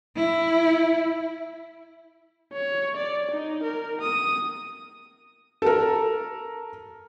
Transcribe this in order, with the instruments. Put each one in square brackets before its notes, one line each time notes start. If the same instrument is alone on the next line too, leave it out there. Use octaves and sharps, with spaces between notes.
[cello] E4
[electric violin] C#5
D5
D#4
A#4
D#6
[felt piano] A4 A#4